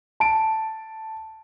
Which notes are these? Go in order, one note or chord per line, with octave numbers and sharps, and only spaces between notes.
A5 D7